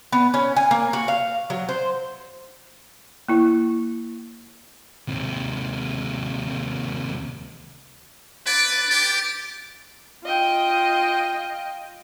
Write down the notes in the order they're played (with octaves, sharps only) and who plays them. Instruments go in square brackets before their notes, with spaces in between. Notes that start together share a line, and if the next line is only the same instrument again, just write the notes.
[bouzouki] B3
C#4
G#5
A#3
F#4
F5
F#3
C5
[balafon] A#3 E4
[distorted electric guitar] D#2 C3
[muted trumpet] B4 [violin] D6 A6
[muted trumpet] G4
[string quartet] F4 D#5 G5